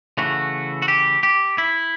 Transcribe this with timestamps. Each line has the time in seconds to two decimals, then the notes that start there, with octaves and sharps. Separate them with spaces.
0.17 C#3 E3 A3 F#4
0.82 F#4
0.88 G4
1.23 G4
1.58 E4